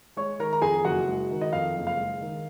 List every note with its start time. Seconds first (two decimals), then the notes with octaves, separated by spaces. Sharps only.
0.17 G#3 C#5 C#6
0.39 D#3 A#4 A#5
0.53 A#5
0.62 F2 G#4 G#5
0.85 F#1 F#4 F#5
1.07 G#3
1.31 D#3
1.41 D#5
1.53 F2 F5
1.76 F#1
1.87 F5
1.97 G#3
2.21 D#3